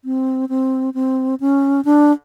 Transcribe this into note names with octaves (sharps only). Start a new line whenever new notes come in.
C4
C4
C4
C#4
D4